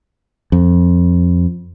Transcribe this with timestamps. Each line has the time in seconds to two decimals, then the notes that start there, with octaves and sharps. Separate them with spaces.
0.52 F2